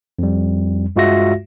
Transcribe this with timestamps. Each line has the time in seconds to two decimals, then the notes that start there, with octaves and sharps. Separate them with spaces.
0.19 F2 G3
0.96 G2 G#3 F4 F#4 E5 A#6